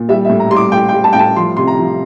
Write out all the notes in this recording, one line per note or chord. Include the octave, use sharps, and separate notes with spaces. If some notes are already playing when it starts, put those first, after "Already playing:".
Already playing: A#2
G3 E5
E5
A2
A#5
G3 C6
D6
A2 G5
G5
G3
A5
A2 G5
A5
F3 C6
C3 C6
A#5
F3